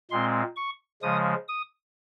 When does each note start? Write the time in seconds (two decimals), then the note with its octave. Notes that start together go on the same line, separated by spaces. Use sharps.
0.11 A#2 G#3 C4 C6
0.56 C#6
1.02 C#3 F3 G#3 D#6
1.48 D#6